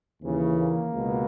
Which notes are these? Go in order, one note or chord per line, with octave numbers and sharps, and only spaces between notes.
D#2 C#3 E3
A#3
C#2 B2